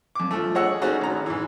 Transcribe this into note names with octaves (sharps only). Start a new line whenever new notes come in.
F2 D6
F3 A3
G#4 C#5 D#5 F#5 E6
A3 C#4 D#4 F#4 G#4
G#1 A#5
G#2 E3